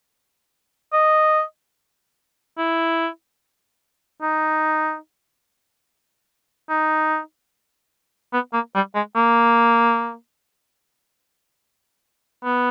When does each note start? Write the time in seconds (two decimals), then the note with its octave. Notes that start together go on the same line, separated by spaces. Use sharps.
0.93 D#5
2.58 E4
4.22 D#4
6.69 D#4
8.33 B3
8.53 A#3
8.75 G3
8.95 G#3
9.16 A#3
12.44 B3